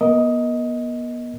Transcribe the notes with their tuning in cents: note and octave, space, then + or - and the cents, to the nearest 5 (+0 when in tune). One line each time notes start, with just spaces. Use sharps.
B3 -35 A#4 +0 D#5 +15